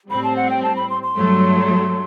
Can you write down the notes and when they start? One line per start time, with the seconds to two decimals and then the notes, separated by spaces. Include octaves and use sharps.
0.10 A2 G3 C4 B5
0.24 A5
0.36 F#5
0.50 G5
0.63 A5
0.76 B5
0.90 C6
1.03 C6
1.16 G2 F#3 A3